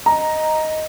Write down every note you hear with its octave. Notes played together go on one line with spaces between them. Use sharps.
D#5 A#5